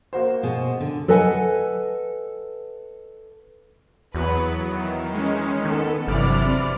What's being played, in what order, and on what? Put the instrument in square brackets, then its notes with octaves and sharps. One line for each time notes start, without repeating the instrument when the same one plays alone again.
[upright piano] A#3 F#4 C5
[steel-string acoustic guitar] B2 G#4
D3
[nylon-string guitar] A4 B4 D#5 F#5 G#5
[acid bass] E2 [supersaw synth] F#3 B3 [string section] B4
[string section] D#3 E3
[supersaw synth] G#3 C#4
[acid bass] D#3 [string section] B3 A4
[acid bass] G1 [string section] C3 E3 F#3 [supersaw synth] D5 F6